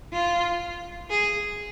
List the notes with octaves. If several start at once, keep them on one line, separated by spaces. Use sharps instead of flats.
F4
G#4